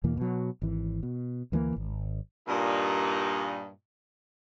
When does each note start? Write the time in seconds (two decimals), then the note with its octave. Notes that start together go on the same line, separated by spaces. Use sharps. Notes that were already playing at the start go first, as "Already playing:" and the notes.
0.04 E2 B2 E3 A#3
0.17 B2 F#3
0.62 G#1 E3
1.03 B2
1.52 D2 E3 G#3 A#3
1.76 G#1
2.48 G2 A#2 D#4